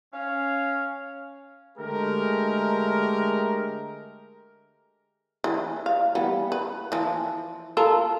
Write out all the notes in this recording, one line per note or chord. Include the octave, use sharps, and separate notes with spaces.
C#4 F5
D3 G#3 A3 G4 A#4
E3
F5
E3 G3 B3
B4
E3 F3
F4 A4 A#4